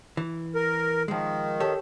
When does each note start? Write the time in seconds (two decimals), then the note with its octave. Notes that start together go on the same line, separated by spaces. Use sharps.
0.17 E3
0.55 A#4
1.08 D#3 F3 G#3
1.60 G4 A4 C#5